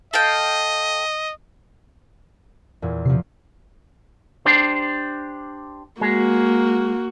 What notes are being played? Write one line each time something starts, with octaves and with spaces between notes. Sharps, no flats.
A4 D#5 F5 G5
E2 A#2
C3 F3 C7
D4 G4 C5
G#3 A#3 F#4